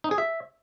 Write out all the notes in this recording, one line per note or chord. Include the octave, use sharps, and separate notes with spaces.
D#4
G#4
E5